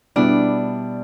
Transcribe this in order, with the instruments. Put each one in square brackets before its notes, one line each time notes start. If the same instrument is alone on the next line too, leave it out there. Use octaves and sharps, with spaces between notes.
[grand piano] B2 G3 B3 E4 [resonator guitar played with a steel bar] D4